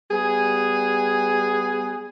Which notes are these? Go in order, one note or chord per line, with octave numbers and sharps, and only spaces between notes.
G3 B3 G#4